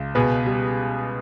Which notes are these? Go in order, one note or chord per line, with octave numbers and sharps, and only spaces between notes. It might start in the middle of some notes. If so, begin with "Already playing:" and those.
Already playing: C#2
B2 G#4 B4
G3